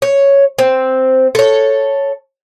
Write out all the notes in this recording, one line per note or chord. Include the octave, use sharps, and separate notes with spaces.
C#5
C4
A4 C#5